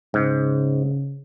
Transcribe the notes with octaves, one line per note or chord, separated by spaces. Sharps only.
G#2 C#3